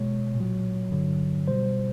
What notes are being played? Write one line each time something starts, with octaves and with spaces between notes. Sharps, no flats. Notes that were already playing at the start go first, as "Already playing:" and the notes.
Already playing: B2 G#3 C#5
A#2
F#3
G2 D3 F#3
B2 G3 C5